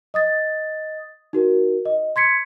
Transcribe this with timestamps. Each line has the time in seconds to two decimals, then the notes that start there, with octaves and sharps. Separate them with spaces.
0.14 D#5 D#6 A6
1.33 D#4 F#4 A#4
1.85 D#5
2.16 C6 G#6 B6 C#7